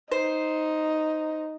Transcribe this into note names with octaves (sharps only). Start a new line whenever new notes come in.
D#4 C5